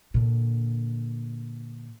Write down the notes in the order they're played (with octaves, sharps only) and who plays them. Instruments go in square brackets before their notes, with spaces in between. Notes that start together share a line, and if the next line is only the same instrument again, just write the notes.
[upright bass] A#2 D3